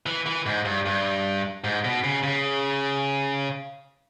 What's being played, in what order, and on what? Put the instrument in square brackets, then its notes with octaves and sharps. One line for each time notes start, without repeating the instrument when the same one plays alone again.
[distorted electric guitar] E3
E3
G#2
G2
G2
G#2
B2
C#3
C#3